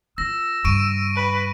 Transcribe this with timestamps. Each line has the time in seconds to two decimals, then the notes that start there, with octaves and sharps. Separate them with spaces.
0.18 F4 E6 A#6
0.65 G2 C#3 C#6 D7 D#7
1.16 B4